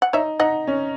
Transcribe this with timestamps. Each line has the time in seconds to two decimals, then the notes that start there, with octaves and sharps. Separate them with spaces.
0.02 F#5
0.13 D#4 C#5 E5
0.40 D#4 D#5 F#5
0.67 C#4